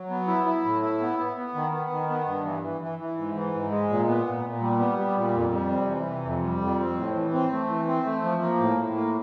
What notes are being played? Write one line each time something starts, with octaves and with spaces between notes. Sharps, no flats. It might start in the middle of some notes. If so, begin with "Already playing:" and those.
Already playing: F#3
B3
E4
E4
A2
E4
B3
B3
B3
D#3
B3
D#3
B3
G2
E3
E3
E3
E3
G#2
E3
G#2
G#3
A#2
B3
A#2
A#2
G3
B3
G3
A#2
F2
G3
C3
E3
C3
F2
G3
F2
C4
A2
E3
C4
A3
E3
C4
A3
F3
A#3
A2
A2
A#3